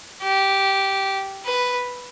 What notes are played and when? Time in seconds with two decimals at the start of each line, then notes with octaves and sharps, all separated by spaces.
0.23 G4
1.46 B4